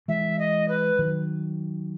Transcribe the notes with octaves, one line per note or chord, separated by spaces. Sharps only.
E3 G#3 E5
D#5
B4
D#3 F#3